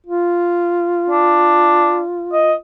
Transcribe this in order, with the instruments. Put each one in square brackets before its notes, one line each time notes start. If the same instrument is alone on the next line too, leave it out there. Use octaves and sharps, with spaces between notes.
[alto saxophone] F4
[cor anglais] D4
D#5